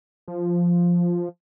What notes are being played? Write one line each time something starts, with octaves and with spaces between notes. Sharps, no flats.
F3